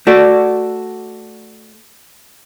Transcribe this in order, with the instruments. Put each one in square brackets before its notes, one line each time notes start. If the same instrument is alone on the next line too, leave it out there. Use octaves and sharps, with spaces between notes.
[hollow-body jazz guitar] A3 F#4 D5